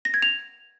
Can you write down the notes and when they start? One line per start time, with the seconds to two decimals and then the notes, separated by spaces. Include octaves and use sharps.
0.05 A#6
0.14 G#6
0.22 F7